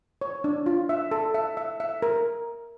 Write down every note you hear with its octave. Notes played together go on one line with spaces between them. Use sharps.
C#5
D4
F4
E5
A4
E5
E5
E5
A#4